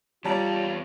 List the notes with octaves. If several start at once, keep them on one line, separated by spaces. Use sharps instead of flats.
E2 G3 F4 C#5 D5 A5 A#5